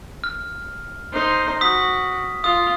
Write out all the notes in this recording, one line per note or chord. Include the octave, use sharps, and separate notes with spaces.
F6
D#4 C5
F#4 D#6 B6
F4 D#6